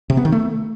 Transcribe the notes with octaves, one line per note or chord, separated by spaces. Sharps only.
C3
B3
D#3
A3